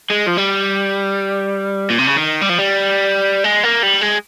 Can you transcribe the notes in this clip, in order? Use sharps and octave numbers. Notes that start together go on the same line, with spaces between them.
G#3
F3
G3
A#2
C3
C#3
D#3
G3
F3
G3
G#3
A#3
G3
G#3